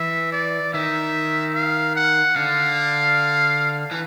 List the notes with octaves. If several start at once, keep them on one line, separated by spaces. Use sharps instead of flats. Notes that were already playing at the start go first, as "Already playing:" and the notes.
Already playing: E3 E5
D5
D#3 E5
F5
F#5
D3 F5
E3